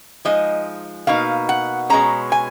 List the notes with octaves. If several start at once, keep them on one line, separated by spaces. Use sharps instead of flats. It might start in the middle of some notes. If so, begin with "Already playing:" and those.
F3 G#3 D#4 D#5
B2 A#3 D#4 F5
F#5
B2 G#3 C#4 A#5
G#5